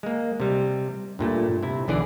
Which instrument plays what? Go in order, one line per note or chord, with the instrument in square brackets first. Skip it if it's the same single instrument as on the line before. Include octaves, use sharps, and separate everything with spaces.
[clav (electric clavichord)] G#3 A#3
C3 G3
G2 A#2 A3
C3 E4
B1 D3 E3 G#4 D5